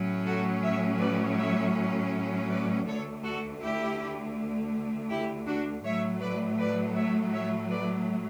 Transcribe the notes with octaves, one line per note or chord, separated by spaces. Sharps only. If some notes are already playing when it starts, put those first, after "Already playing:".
Already playing: A2 F#3 C#4
F#4 A4
C#5 E5
B4 D5
C#5 E5
B4 D5
D2 D3 A3 A4 C#5
F#4 A4
E4 G4
E4 G4
D4 F#4
A2 F#3 A3 C#5 E5
B4 D5
B4 D5
C#5 E5
C#5 E5
B4 D5